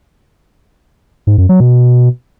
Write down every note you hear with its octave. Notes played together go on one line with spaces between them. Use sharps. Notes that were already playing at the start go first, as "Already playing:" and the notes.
G#2
F#2
F#3
B2